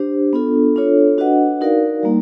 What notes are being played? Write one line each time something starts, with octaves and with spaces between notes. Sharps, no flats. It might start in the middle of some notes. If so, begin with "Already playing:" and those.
Already playing: D4 G4 C5
B3 D4 F4 A4
D4 F4 A4 C#5
D4 F#4 B4 D#5 F#5
D#4 F#4 A#4 D5 F5
G3 A#3 D#4